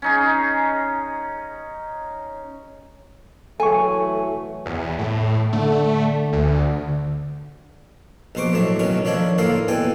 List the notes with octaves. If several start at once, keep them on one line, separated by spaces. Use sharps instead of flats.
C#4 D#4 G#4
E3 F#3 A3 A4 G#5 C#6
E2
A2
D3 A3
D2
A#1 B2 C5 C#6 D6
A2 F#3 A3 A5
B1 B2 D#3 C#4 C#6
D#3 F3 D4 A4 C#5
A2 D3 A#3 F4 A4 F5
B2 E3 A4 G5 G#5